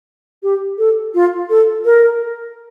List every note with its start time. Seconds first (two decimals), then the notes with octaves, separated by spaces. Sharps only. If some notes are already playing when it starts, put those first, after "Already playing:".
0.43 G4
0.78 A4
1.14 F4
1.50 A4
1.85 A#4